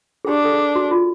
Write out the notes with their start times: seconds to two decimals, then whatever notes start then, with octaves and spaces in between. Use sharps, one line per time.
0.25 G#4
0.29 D4 G4
0.44 A4
0.52 G#4
0.75 F#4
0.91 F4